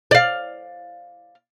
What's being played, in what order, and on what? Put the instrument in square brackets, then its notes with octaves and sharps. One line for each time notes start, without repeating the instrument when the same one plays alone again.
[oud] D5 F5